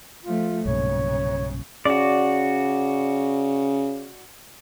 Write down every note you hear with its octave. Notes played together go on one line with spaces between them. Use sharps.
F3 A3 F4
B1 G2 A#2 C#3 C#5
C#3 F#4 D5